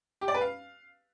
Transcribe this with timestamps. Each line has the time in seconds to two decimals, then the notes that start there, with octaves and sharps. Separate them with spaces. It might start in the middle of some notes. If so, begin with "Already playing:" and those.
0.21 G4
0.28 D5
0.35 B4
0.41 F5